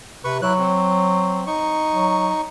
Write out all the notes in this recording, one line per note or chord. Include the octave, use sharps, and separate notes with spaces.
C3 B4 C#6
F#3 E4 F#6
C4
D#4 C#6
F#3